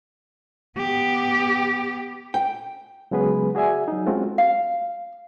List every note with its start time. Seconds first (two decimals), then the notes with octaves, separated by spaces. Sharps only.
0.78 B3 G4
2.34 G5
3.11 C#3 F#3 G#3 B3 G#4 B4
3.55 F#4 G#4 D5 E5 G#5
3.88 F#3 D#4
4.06 G#3 A3 C4 C#4 F4 F#4
4.38 F5